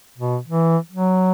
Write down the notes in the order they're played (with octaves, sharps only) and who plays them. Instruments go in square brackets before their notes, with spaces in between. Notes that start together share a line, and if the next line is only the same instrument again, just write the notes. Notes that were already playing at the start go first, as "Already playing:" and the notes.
[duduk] B2
E3
F#3